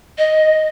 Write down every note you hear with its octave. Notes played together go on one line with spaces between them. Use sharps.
D#5